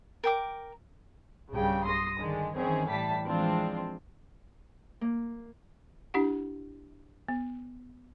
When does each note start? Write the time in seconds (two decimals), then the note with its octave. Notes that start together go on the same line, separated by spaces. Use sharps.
0.24 A#4 G5 D6
1.53 B1 G2 C#3 G3 G5
1.86 C6 D#6 A#6
2.20 D3 D#3 G#3
2.56 D#3 E3 C4 C#4 G#4
2.89 A2 E3 G3 A5 B6
3.25 E3 F3 G#3 C4 D4 F4
5.01 A#3
6.14 D4 E4 G4 F#5
7.28 B3